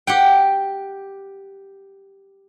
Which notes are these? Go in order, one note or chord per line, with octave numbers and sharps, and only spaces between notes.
G4 F#5 G5